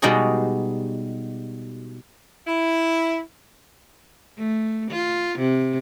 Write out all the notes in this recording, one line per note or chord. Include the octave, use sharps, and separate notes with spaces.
B2 G3 G#3 D#4 F#4 G#4
E4
A3
F4
C3